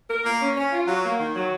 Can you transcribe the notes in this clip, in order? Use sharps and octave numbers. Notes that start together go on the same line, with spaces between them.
A#4
A#3
C#4
C#4
F4
F#3
A#3
D#3
F#3